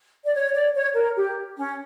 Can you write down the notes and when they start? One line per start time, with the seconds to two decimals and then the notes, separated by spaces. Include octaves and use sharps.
0.23 D5
0.34 C#5
0.54 D5
0.75 C#5
0.95 A#4
1.16 G4
1.57 C#4